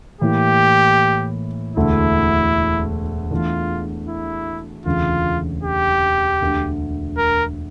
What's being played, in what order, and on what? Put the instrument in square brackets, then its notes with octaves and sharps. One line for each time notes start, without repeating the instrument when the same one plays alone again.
[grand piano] A2 E3 A#3 E4 [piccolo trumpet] G4
[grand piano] E1 D2 D3 A3 [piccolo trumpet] E4
[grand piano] E2 E3 A3 D4 [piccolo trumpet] F4
[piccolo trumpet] E4
[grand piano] E1 D2 C#3 E3 [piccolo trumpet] F4
[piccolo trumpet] G4
[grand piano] E1 D2 D3
[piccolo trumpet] A#4